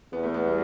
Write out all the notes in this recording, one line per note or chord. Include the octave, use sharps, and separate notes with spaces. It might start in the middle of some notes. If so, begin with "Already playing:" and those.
E2 B3
A3
B3
G3